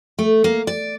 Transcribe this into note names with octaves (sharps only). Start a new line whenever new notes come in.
A3
A#3
D5